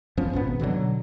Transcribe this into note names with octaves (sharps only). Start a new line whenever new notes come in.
F#2 F3 B3 C#4
G#1 B2 B3
B2 D3 E3 F#3